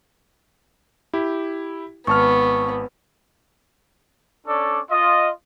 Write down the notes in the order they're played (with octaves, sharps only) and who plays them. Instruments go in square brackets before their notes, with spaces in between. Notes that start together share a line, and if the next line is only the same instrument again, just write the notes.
[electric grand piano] E4 G4
[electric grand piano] G#1 A5 F6 [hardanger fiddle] B3 [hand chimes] C#6
[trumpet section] C#4 D4 A4 D5
F4 D#5